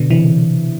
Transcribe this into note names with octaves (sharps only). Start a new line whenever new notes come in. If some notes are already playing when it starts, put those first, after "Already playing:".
Already playing: B2 D3
C3 E3